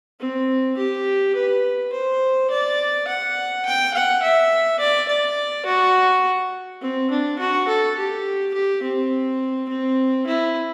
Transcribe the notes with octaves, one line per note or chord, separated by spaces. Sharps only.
C4
G4
B4
C5
D5
F#5
G5
F#5
E5
D5
D5
F#4
C4
D4
F#4
A4
G4
G4
C4
C4
E4